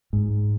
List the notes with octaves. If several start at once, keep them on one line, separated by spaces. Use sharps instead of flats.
G#2